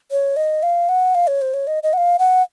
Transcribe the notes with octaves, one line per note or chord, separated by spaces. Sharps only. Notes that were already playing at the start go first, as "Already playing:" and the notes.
C#5
D#5
F5
F#5
F5
C#5
C5
C#5
D#5
D#5
F#5
F5
F#5